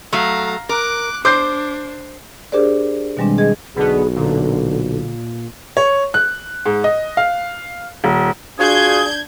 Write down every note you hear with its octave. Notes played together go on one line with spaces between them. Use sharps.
F#3 A3 F5 A#5
A#4 D6 F#6
D4 C5 D6 G6 C7
D4 G4 G#4 A#4 C5 D5
B2 D#3 G3 G#3 C4 D4
G#4 D#5 G#6
B1 B2 D3 B3 G#4
A#2 D3
C#5
F#6
G#2
D#5
F5
D#1
D4 F4 F#4 G#4 G6 G#6